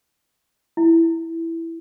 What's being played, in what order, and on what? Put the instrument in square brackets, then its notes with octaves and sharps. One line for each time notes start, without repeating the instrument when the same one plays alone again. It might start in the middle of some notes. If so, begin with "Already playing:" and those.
[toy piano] E4